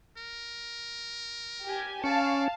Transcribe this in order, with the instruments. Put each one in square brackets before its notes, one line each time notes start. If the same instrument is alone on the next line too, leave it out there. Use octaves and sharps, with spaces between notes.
[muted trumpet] A#4
[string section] G4 G#5
[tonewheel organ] C#4 [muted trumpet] D5 [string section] F5 A5